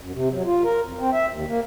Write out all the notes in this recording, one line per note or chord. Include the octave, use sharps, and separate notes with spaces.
F#2
C3
F#3
F4
A#4
F2
C4
E5
D#2
A#3